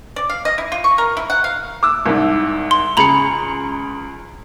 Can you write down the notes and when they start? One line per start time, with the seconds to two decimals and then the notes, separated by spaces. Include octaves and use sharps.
0.16 D5
0.30 F5
0.45 D#5
0.58 E4
0.72 F4
0.84 C#6
0.98 A#4
1.17 E4
1.30 F#5
1.44 F5
1.83 D6 E6
2.06 C2 G#2
2.71 C6
2.97 C#2 G#4 A#5 B5 C#7